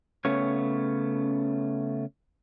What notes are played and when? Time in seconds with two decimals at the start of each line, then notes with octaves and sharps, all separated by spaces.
0.25 C#3 A3 B3 C#4 C#5